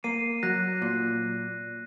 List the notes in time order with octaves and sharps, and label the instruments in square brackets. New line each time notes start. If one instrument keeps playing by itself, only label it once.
[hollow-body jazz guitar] A#3 [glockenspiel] C7 D#7
[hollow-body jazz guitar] F#3 [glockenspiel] F#6 A#6
[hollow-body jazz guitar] A#2